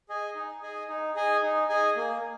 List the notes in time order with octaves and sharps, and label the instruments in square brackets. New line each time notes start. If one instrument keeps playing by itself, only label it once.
[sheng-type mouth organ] G#4 D#5 G#5
D#4
G#4 D#5 G#5
D#4
G#4 D#5 G#5
D#4
G#4 D#5 G#5
A#3